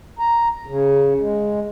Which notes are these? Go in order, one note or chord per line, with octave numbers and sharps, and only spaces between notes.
A#5
C#3
G#3